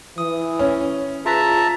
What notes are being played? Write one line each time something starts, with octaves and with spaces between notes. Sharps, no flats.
E3 D#6
C#4
F4 G#4 B4 E5 A5 A#5